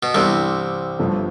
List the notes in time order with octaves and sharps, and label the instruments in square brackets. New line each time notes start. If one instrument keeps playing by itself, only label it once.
[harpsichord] B2
[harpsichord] C2 C3 [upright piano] G2 E3 B3
[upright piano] G1 G2 F3 A3